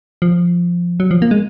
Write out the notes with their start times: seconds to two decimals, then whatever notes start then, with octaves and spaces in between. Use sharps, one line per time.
0.22 F3
1.00 F#3
1.11 F3
1.22 A#3
1.31 G#3